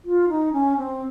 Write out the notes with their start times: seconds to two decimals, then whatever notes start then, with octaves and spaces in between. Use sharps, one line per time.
0.05 F4
0.29 D#4
0.53 C#4
0.77 C4